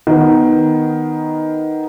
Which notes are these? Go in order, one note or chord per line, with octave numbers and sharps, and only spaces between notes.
D#3 B3